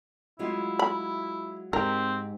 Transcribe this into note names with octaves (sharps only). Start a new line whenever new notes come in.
F#3 G#3 E4 F4
B5
G#2 C4 G4 A#4